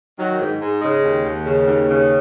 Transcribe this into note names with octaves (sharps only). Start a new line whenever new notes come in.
D#3 F#3
G#2
G#2
C#3 G#3
D#2
D#2
C#3
D#2
C#3